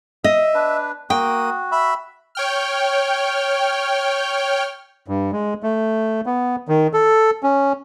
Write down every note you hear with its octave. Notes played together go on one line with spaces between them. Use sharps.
D#5 E5
D4 B4
A#3 F#4 G5 D#6
E5 B5
C#5 G5 F6
G2
G#3
A3
B3
D#3
A4
C#4